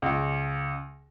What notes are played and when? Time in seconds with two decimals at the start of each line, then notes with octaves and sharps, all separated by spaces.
0.02 C#2